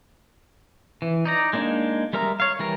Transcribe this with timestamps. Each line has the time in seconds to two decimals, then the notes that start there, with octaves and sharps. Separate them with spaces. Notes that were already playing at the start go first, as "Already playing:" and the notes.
1.02 E3
1.25 D#4 D5 A#5
1.53 G#3 A#3 D4 D#4
2.13 G3 G#3 A#4 E5 A#5
2.40 C#5 F5
2.59 E3 G3 A#4